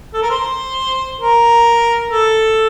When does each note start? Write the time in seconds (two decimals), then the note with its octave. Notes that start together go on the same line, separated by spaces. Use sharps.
0.14 A4
0.22 A#4
0.31 C5
1.21 A#4
2.10 A4